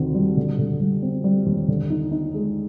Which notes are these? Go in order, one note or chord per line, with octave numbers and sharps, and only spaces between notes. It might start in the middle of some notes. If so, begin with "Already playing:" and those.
Already playing: D2 C3 D#3
G3
D3
D3
G3
C4
G3
D#2
D3
D#4
D#4
G#3